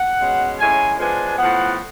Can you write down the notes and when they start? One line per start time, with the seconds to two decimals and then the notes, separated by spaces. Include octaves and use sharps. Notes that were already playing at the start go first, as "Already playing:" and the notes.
Already playing: F#5
0.20 B2 G#3 C#4
0.59 A2 G#3 C#4 G#5
0.98 F3 G#3 B3 D4 G#5
1.38 A2 F3 B3 F#5